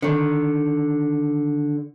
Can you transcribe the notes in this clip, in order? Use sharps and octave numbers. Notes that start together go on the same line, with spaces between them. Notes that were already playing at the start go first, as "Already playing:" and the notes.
D3 D#3